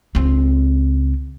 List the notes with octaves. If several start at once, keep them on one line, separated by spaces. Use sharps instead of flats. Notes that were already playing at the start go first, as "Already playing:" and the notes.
C#2 C4